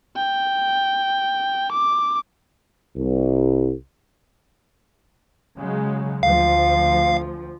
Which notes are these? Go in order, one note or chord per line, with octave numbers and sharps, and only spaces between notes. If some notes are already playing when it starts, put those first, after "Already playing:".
G5
D6
C2
C#3 F#3 G#3
D2 F3 F5